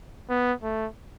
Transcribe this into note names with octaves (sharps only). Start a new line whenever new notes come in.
B3
A3